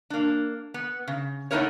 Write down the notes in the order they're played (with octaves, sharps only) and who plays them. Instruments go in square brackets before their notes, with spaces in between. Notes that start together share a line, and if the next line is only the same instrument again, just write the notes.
[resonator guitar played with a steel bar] A#3 D4
B3
C#3
A3 B3 D#4 E4 A#4 C#5